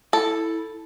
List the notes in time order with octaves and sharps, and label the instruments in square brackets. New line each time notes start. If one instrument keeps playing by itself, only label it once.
[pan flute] E4 [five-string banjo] A4